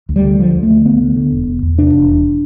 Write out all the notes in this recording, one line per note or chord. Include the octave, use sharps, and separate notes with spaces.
D2
G3
D3
D3 F3
D2
A3
D3
D2 B3
D3
D3
E1
E1
E2
C3 D4
E1
E2